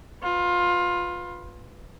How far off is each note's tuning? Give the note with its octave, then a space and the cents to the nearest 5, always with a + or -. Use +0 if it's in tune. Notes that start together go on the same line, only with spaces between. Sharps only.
F4 +20 B4 +0